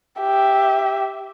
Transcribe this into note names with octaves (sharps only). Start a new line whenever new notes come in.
G4 E5